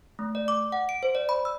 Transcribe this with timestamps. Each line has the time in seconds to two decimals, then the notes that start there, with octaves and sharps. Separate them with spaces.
0.19 A3
0.35 D5
0.48 D6
0.72 F#5
0.89 D7
1.03 C5
1.15 D5
1.29 B5
1.45 E6